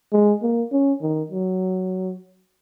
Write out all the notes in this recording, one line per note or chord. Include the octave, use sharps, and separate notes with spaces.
G#3
A#3
C#4
D#3
F#3